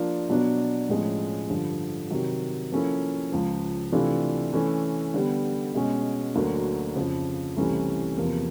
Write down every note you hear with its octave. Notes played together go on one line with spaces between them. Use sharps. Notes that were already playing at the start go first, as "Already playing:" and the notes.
Already playing: F3 A#3 D4 F4 A#4
B2 F#3 B3 D4
A2 F3 G#3 C#4
G2 D3 F3
C3 D#3 F#3
F3 A#3 C#4 E4 A4
C#2 C#3 F3
C3 E3 A3 D4 F4
E3 A3 C#4
D3 G3 B3
B2 G#3 C#4
D2 D3 F#3 A#3
F2 C#3 F3
C2 C3 E3 A3 C#4
E2 C3 F3 A#3